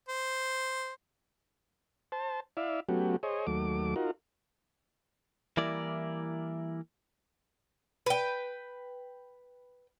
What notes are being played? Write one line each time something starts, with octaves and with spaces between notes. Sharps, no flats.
C5
C5 A5
E4 D5 E5 F5
F#3 A3 B3 C#4 F#4 G4
G#4 C5 C#5 D#5
D#2 F#3 A3 D6
D#4 F4 F#4 A#4
E3 G3 A#3 E4 A#4 D5
B4 G5